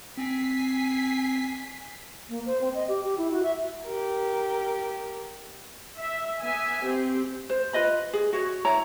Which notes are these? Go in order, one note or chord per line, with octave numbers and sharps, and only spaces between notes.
C4 G#5 B6 C7
A#3
C5
C4
D#5
G4
G4
E4
F#4
E5
G4 A#4
E5
B3 E5 G#5
C4 G4
C5
F4 B4 D#5 B5
G#4
F#4 C#5
E4 C#5 A#5